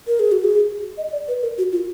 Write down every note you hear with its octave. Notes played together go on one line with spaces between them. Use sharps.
A#4
G#4
F#4
G#4
D#5
D5
B4
A#4
F#4
F4